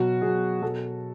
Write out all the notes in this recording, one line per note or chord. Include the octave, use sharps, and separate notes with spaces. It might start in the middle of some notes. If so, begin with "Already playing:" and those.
Already playing: B2 F#3 F#4
B2 F#3 G#4
B2 F#3 A4